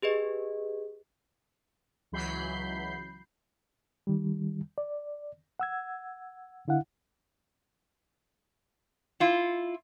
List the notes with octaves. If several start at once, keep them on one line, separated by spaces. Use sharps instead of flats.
G4 G#4 B4 D#5
C#2 E3 F#3 B5 G6 C7
D#3 G3
D5
F#5 E6 G#6
D3 E4 F5 F#5
E4 F4